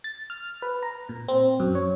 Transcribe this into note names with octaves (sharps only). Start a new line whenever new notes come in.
A6
F6
B4
A#5
A#2
C4
F#2
C#5